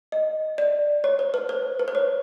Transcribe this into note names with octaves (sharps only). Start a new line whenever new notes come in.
D#5
D5
C#5
C5
B4
C5
B4
C5
C#5